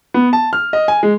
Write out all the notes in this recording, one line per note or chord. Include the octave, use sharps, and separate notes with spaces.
B3
A5
F6
D#5
G#5
G#3